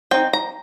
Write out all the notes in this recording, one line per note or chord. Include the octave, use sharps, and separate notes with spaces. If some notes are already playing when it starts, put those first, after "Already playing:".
C4 D#4 G5
A#5